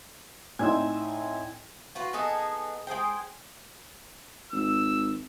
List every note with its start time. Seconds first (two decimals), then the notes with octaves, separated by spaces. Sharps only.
0.59 A2 C4 D#4 D5 E5 G#5
1.95 F4 F#4 B4
2.13 B3 D#4 G#4 A4
2.87 G#3 G#4 C5 G5
4.52 G#1 E6